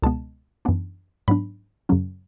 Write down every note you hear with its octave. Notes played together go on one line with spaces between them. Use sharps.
C#2 B2 G#3 B3 A5
F#2 E3 B3 D4
G#2 F#3 B3 D4 B5
F#2 C#3 F#3 C#4